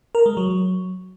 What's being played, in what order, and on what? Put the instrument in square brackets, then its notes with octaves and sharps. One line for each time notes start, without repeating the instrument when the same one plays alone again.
[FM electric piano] A#4
G#3
F#3